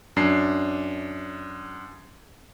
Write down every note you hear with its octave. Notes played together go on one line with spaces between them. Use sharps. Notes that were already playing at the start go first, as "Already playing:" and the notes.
F#2 D4 C7